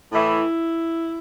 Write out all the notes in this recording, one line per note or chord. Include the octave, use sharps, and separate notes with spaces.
A2 E3 E4